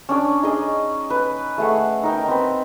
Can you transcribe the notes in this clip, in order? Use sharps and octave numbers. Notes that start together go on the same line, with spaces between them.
C#4 D4 D5
D#4 G#4 D#5
B4
A3 G#4 F#5
D#4 A#4 G5
C4 B4